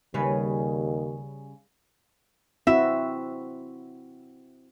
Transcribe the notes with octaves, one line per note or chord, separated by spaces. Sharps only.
D#2 C#3 G3 B4
C4 E4 F#4 E5